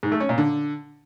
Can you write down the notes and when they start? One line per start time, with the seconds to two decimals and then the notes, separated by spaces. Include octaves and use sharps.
0.03 G#2
0.12 A3
0.20 C#4
0.29 A#2
0.38 D3